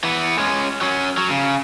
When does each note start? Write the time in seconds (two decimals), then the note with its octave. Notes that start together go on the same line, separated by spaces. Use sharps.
0.04 E3 B3
0.38 G#3 C#4
0.81 F#3 C#4
1.18 F#3
1.30 C#3